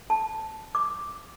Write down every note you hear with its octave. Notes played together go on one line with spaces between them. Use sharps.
A5
D6